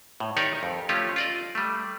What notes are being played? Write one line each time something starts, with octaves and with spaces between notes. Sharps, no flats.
A2
D#3 D#4 G4 A#4 C#5 D5
F2
F3 A3 C#4 F4 G4
F4 D5 D#5
G3 A3